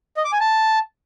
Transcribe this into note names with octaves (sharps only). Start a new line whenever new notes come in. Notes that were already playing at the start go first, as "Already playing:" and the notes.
D#5
D6
G#5
A5